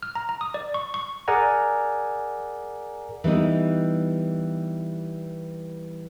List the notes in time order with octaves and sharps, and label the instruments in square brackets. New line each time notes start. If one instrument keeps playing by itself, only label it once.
[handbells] F6
A#5
A#5
D#6
D5
C#6
C#6
[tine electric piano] G#4 A#4 D5 F#5 G#5 A#5
[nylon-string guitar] E3 G3 B3 D#4